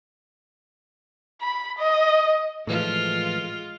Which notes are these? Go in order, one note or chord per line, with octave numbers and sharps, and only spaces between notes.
B5
D#5
A2 E3 F3 G#3 F4